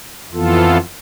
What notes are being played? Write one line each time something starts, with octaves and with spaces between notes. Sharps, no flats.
F2 E3 B3 F4 A4